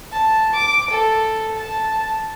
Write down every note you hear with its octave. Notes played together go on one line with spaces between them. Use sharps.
A5
D6
A4
A5